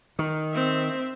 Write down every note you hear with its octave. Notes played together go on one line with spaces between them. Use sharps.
D#3
C4 E5